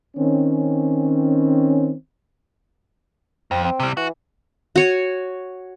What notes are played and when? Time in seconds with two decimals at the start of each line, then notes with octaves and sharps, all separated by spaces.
0.15 D#3 C4 C#4
3.51 F2 C4
3.65 C4
3.80 C3 G3
3.97 E3 F#4
4.76 F#4 C#5 G#5